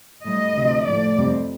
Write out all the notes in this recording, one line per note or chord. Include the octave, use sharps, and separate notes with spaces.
A2 G3 D#5
D2 C3 F3
A2 F3 A3 D5
F2 C3 G3